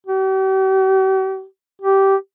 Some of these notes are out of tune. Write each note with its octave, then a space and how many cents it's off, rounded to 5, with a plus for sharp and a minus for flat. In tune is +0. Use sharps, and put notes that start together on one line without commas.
G4 -45
G4 -15